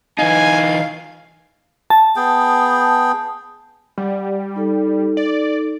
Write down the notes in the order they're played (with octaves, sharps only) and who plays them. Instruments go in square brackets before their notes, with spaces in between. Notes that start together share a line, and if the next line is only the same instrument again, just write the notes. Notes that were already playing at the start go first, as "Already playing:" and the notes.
[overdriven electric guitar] E3 D#4 [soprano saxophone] F5 [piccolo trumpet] G#5
[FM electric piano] A5
[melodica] B3 G#4 G5
[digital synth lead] G3 [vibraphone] G4 D5 F#5
[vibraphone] D#4 A4
[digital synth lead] D5